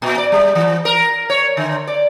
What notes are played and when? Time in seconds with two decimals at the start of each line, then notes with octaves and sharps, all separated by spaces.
0.02 A#2
0.18 D5
0.32 G3
0.55 E3
0.85 A#4
1.30 C#5
1.57 D3
1.87 D5